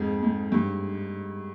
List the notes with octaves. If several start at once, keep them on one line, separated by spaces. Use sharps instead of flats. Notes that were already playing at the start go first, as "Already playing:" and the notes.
Already playing: F2 G#2 G#4
G#2
G2